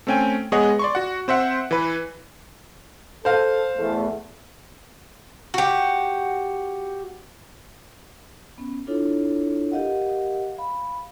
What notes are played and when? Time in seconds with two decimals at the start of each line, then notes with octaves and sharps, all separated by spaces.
0.07 A3 C4 C#4 G5 G#5
0.52 G#3 B3 G#4 C#5 D#5 F#5
0.79 D5 C6 C#6
0.95 F#4 F#5
1.28 C4 C5 E5 F#5
1.71 E3 B4
3.25 A4 C5 F5
3.77 E2 A3
5.54 F#4 G4
8.58 B3 C#4
8.87 D4 E4 F4 A4 C#5
9.71 G4 A#4 D#5 F5 F#5
10.57 F5 B5